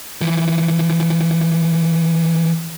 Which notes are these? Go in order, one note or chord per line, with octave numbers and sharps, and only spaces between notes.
E3 F3